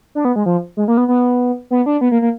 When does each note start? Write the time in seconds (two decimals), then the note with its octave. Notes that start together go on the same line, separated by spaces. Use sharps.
0.15 D4
0.25 B3
0.36 G#3
0.46 F3
0.77 G#3
0.88 A#3
0.97 B3
1.08 B3
1.71 B3
1.86 D4
2.01 B3
2.12 A#3
2.22 A#3